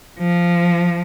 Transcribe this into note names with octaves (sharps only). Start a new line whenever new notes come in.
F3